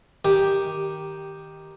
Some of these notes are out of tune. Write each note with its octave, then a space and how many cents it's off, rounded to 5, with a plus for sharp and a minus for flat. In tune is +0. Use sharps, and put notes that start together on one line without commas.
D#3 +0 G4 +0